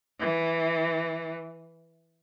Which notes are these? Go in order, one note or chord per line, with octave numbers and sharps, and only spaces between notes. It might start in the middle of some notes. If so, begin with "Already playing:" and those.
E3